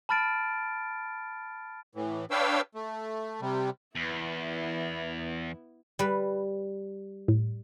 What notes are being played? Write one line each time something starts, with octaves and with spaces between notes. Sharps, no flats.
A5 B5 F6 A6 D7
A2 E3
D4 B4 C#5 F5 G5 E6
A3
C3 G3
E2 B3 E4
G3 B4
A2